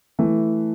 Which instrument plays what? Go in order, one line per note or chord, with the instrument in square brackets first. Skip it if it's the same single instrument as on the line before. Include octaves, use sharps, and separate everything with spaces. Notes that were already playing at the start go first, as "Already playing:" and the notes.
[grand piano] E3 A3